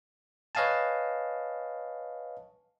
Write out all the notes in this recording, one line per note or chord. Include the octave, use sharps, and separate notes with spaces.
B4 C#5 D#5 F5 G#5 A5